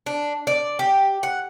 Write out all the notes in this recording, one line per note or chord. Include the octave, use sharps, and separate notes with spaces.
D4
D5
G4
F#5